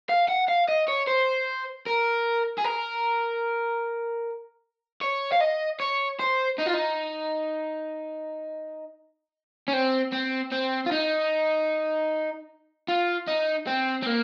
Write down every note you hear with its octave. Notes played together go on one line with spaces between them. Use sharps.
F5
F#5
F5
D#5
C#5
C5
A#4
G#4
A#4
C#5
F5
D#5
C#5
C5
D#4
F4
D#4
C#4
C4
C4
C4
F4
D#4
F4
D#4
C4
C4
A#3